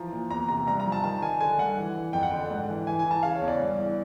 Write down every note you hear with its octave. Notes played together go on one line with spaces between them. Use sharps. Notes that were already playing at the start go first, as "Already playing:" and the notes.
Already playing: E3 F3 A#5
A#2
E2 A#5
C3 A#5
G2 A#5
A#5
F3
A5
D#3 A5
D#3 G#5
D3 G#5
G2 F#5
E3
E3
F2 G5
F#5
D3 G5
G#2
E3
E3 G#5
G#5
E3
A5
C#3 F5
C#5
E2
D5
G2
E3